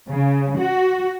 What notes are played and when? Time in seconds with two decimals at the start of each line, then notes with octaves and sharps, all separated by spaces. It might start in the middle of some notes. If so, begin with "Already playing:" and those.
0.10 C#3
0.58 F#4